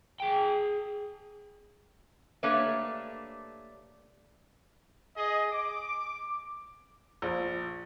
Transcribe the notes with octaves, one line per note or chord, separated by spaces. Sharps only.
G#4 G5
A3 A#3 D4 G4 B4 C#5
G#4 D#5
D6
A#1